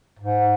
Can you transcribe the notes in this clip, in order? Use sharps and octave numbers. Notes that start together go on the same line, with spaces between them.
G#2